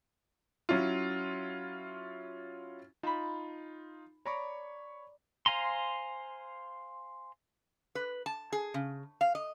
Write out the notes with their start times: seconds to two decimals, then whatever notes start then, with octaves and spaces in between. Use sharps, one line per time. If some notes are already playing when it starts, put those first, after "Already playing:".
0.69 F#3 C#4 E4 F4
3.03 D#4 F4 A5 B5
4.25 C#5 D5 A#5 B5 C#6
5.46 C5 F5 G#5 A#5 C6
7.95 B4
8.26 A5
8.52 G#4
8.74 C#3
9.21 F5
9.35 D#5